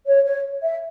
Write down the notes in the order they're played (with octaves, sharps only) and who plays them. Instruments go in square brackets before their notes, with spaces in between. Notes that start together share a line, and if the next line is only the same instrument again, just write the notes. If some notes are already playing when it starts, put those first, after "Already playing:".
[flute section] C#5
C#5
E5